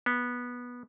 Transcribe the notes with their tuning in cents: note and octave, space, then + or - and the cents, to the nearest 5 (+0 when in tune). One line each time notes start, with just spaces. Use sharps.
B3 -15